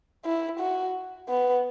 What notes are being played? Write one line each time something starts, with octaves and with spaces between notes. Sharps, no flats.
E4
F#4
B3